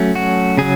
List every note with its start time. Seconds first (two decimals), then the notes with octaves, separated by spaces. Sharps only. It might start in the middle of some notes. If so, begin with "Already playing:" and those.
Already playing: F#3 A3 C#4
0.15 F#4
0.57 C#3 F#3 G#4